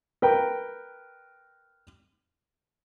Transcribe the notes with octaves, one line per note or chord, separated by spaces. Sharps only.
A#4 B4 G5